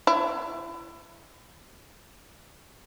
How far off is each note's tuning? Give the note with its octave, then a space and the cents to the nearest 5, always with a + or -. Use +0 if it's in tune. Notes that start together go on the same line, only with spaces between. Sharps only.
E4 +30